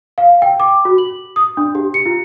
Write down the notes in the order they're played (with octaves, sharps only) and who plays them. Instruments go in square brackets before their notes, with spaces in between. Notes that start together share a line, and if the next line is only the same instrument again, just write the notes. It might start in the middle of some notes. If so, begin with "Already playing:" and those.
[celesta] F5
G5
D6
F#4
F#7
D#6
D4
G4
C#7
F4